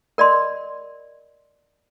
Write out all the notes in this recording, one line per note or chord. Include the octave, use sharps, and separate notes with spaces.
A#4 D5 D#5 C6